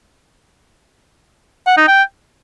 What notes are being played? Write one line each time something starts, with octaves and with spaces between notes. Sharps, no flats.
F#5
D#4
G5